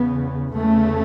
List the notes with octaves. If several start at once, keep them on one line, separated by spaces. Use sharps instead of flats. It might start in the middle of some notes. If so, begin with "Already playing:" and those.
Already playing: E2 C#3 B3
E2 C#3 A3